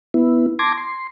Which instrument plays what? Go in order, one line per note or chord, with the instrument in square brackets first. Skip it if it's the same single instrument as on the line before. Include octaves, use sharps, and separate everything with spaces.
[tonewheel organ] B3 E4
A5 C6 D6 G#6 A#6
C6